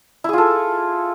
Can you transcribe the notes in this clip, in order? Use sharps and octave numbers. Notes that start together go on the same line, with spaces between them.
E4 F4 G#4 A4